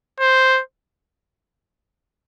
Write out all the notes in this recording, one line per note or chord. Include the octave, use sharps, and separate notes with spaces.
C5